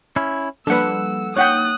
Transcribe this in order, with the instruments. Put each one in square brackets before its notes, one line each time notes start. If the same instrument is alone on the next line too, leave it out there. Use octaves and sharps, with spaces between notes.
[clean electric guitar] C#4 E4
[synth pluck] F3 G3 A#3 [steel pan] D4 B4 [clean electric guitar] A4 F#5 [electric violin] E6
[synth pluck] A#3 D#4 A6 [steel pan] C#5 F#5 G5 [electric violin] D#6 F#6